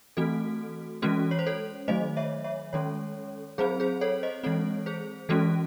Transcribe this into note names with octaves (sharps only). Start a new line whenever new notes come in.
E3 A3 C4 F#4 A4
E3 G#3 C#4 F#4 A4
C#5
C5
A4 C#5
D#3 F#3 A3 C5 D#5
C#5 E5
C#5 E5
D#3 G#3 C#4 A4 C#5
F#3 C4 G#4 C5
G#4 C5
A4 C#5
C5 D#5
E3 G#3 C4 A4 C#5
G#4 C5
E3 G#3 C#4 F#4 A4